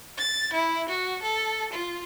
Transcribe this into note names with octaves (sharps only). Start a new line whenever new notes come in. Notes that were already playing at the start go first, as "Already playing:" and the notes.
A6
E4
F#4
A4
F4